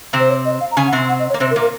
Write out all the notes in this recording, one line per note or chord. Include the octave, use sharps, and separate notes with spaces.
C3 C4
C5
C#5
D#5
F5
A#5
C#3 C#4 G#5
F#5
C3 C4
F#5
D#5
C#5
A#3
C3 C4 C5
A#4
A#2 A#3
A#4